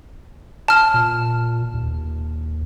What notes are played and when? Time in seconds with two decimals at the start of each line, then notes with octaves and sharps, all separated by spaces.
0.68 A5 F6
0.94 A#2
1.73 D#2